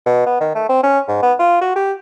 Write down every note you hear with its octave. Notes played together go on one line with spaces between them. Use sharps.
B2
B3
D#3
A3
C4
C#4
G#2
B3
F4
F#4
G4